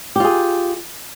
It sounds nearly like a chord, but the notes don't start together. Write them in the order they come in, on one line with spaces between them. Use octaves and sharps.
G4 F4 G#4